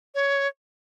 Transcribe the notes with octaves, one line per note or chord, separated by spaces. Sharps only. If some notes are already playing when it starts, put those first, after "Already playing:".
C#5